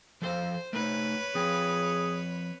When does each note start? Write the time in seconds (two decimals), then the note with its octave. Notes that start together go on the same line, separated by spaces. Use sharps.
0.22 F3 A4 C5 F5
0.73 A3 D#4 B4 C#5
1.35 F3 C4 G#4 G5